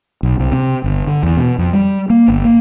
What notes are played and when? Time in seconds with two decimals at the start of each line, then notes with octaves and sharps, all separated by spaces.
0.23 B1
0.39 C2
0.52 C3
0.84 G1
1.07 D3
1.23 E2
1.37 B2
1.58 F2
1.73 G3
2.10 A#3
2.28 G1
2.45 A#3